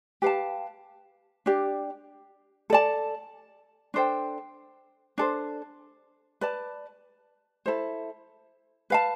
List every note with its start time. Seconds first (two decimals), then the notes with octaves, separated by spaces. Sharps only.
0.22 G4 B4 F5 A5
1.46 D4 G4 D5
2.70 A4 D5 A5
3.94 D4 A4 C5 G5
5.18 D4 A4 C5
6.41 B4 D5 A5
7.66 E4 A4 C5
8.90 B4 F5 A5